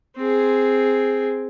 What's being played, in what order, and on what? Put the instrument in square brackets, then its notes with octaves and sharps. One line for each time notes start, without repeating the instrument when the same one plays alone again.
[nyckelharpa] C4 G#4